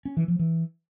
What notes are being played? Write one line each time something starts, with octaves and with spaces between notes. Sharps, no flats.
C#4
E3
F3
E3